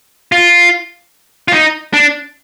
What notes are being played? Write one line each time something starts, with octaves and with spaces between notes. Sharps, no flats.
F4
F4
D#4
D4